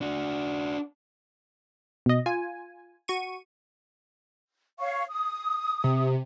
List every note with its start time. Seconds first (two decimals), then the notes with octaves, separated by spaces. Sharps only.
0.01 D4 F#4
2.06 B2 D#5
2.26 F4 G#5
3.08 F#4 C#6 D#7
4.80 C#5 F5 C#6
5.09 D#6
5.84 C3